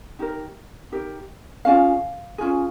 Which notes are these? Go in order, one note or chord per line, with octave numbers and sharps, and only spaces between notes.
D#4 G4 A#4
D#4 G4 A#4
C#4 F4 G#4 F5
C#4 F4 G#4